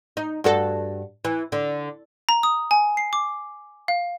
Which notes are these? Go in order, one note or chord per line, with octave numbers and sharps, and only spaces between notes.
D#4
G2 F#4 A4
E3
D3
A#5
D#6
G#5
C7
D6
F5